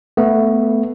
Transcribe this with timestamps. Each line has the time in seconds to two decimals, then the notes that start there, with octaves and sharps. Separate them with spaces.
0.17 A3 B3